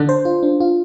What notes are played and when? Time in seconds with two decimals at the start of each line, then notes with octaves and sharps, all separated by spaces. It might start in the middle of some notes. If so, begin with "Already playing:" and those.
Already playing: D3 D4
0.09 C5
0.25 F4
0.43 D4
0.60 F4